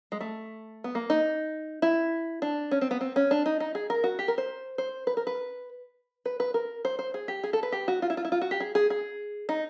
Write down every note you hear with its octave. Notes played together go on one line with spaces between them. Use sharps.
G#3
A3
B3
A#3
D#4
E4
D4
C#4
C4
B3
C4
C#4
D4
D#4
D#4
G#4
A#4
F#4
G4
A#4
C5
C5
B4
A#4
B4
B4
B4
A#4
C5
C5
G#4
G4
G#4
A4
B4
G4
F#4
F4
E4
F4
E4
F4
F#4
G4
G#4
G#4
G#4
D#4